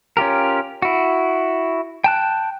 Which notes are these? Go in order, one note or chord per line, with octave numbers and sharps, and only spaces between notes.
C#4 F4 G4 A#4
E4 F#4
G5 A5 F#6